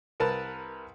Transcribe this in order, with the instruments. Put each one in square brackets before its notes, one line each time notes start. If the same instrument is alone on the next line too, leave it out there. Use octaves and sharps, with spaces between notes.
[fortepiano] C2 A#4 B4 A5